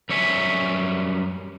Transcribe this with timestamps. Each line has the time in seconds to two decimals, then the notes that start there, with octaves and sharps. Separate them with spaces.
0.09 F#2 G3 C#5 E5 G#5